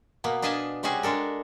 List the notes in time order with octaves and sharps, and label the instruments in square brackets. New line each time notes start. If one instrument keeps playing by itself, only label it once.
[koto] B2 A#3 B3
D4 B4 D#5 F5 G#5 A5
C3 G3 C#4 F#4 G#4 G#5
G#3 D4 A4 A#4